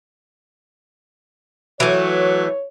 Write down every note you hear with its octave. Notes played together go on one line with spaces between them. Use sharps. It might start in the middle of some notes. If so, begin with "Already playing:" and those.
E3 F#3 A3 C#5